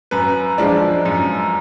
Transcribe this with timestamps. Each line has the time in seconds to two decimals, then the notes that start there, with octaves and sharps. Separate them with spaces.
0.11 F#2 B4
0.58 F3 G#3 D4
1.05 F#2